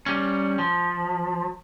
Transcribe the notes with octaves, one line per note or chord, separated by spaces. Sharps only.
G3 C#4
F3